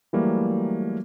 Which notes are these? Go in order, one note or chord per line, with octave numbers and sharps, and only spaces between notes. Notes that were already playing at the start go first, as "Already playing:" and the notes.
E3 F#3 G3 A3 A#3